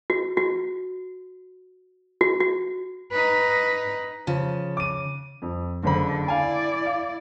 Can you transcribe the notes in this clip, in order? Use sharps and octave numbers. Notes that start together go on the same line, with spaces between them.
F#4
F#4
F#4
F#4
D#4 B4
C#3 F3
D6 D#7
F2
F#1 D3 C5 B5
E4 D5 F5 G#5 B5
F5